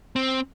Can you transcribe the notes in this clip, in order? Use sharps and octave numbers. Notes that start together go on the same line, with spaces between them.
C4